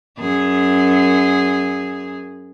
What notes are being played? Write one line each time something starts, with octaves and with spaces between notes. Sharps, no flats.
F#2 G#4